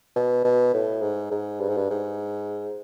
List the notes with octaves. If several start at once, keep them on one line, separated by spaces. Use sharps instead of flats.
B2
B2
A2
G#2
G#2
G2
G#2
G2
G#2